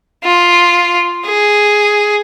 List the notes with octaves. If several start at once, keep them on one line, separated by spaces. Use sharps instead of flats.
F4
G#4